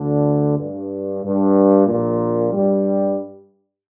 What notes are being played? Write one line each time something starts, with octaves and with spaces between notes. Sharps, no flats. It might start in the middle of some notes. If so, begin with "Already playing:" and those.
Already playing: D2 D3
G2
G2
A#1 A#2
G2 G3